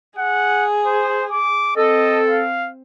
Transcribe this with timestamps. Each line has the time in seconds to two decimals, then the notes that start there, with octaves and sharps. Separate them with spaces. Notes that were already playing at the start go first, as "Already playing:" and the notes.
0.19 G#4 F#5
0.86 C5
1.32 D6
1.77 C4 A4 D#5
2.30 F5